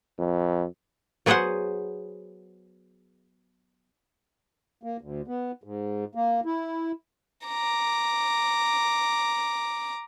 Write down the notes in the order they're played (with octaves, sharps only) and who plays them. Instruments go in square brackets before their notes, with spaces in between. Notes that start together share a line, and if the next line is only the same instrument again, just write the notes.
[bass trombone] F2
[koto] F#3 B3 G#4 B4 C5 F#5
[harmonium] A#3
D2
B3
G#2
A#3
E4
[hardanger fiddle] A#5 D6